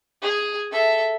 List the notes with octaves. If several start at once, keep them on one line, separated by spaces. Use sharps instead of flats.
G#4
A4 E5